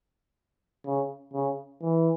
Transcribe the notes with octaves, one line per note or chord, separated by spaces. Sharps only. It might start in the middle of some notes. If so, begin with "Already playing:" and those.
C#3
C#3
E3